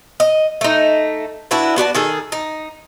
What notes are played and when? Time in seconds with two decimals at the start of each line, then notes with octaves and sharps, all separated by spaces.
0.20 D#5
0.61 A3 D#4
1.51 D4 E4 F#4 B4
1.76 B3 F#4 D5 A5
1.95 D#3 G#4 A4
2.32 D#4